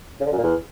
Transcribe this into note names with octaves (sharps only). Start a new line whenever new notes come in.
C#3
D3
F#2
A#2
E2